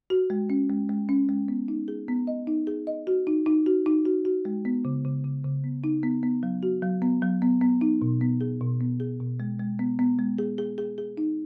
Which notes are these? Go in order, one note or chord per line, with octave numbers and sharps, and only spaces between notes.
F#4
G#3
C#4
G#3
G#3
C#4
G#3
B3
D#4
G#4
B3
D#5
D#4
G#4
D#5
F#4
D#4
D#4
F#4
D#4
F#4
F#4
G#3
B3
C#3
C#3
C#3
C#3
B3
D#4
B3
B3
F#3
F#4
F#3
B3
F#3
B3
B3
D#4
B2
B3
G#4
B2
B3
G#4
B2
G#3
G#3
B3
B3
G#3
G#4
G#4
G#4
G#4
D#4